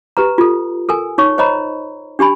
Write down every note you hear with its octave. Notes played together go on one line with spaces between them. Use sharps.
G4 B4 A#5
F4 A4
A4 A#4 G#5
D#4 C#5 C#6
C5 C#5 D#5 A#5 B5
D4 G4 G#5 B5